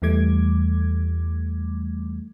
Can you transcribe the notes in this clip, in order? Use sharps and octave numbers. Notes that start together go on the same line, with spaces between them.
E2 E3 G3 A3 D6 G#6